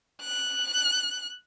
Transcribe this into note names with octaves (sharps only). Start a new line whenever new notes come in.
F#6